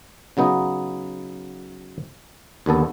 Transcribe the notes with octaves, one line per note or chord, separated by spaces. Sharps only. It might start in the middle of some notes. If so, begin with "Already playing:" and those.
C#3 F#3 B3 D#4
D#2 D3 B3 A4